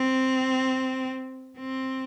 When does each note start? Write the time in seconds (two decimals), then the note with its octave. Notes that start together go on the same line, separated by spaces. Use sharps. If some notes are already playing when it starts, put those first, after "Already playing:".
Already playing: C4
1.58 C4